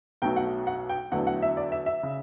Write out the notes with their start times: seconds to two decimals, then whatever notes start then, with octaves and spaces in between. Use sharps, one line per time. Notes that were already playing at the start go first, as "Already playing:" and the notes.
0.22 B1 B2 F#3 A3 G5
0.36 F#5
0.67 F#5
0.89 G5
1.12 E2 D3 F#3 A3 F#5
1.27 F#5
1.42 E5
1.57 D5
1.72 E5
1.86 E5
2.03 C#3